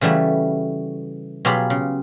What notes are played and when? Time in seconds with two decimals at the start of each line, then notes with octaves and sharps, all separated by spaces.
0.01 C#3 E3 G3 A3 F#4
1.45 B2 F#3 F4 G4 G#4 B5
1.70 C#3